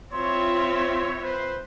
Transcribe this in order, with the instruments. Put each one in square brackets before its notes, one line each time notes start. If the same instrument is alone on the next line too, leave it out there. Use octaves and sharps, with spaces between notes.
[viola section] C4 F4 E5 [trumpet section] E4 C#5 [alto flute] C6
[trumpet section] B4 C5